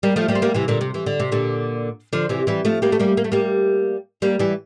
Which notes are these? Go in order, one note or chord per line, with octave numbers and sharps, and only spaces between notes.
G3 A#3
F3 A3
G3 A#3
C4
G3 A#3
C3 E3
A#2 D3
C3
E3
D3
C3
A#2 D3
D3 F3
C3 E3
E3 G3
F3 A3
G3 A#3
A3
G3 A#3
A#3
A3
G3 A#3
G3 A#3
E3 G3